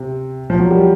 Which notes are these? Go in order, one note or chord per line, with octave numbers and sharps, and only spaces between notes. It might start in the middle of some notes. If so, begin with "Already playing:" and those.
Already playing: C3
F3
F#3
G3